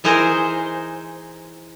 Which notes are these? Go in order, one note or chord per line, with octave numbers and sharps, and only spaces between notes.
E3 D#4 G#4 A#4 C5